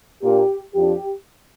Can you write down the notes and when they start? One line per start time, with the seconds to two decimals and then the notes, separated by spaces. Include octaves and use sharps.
0.22 A#2 A#3 D4 G4
0.75 F2 F3 D4 G4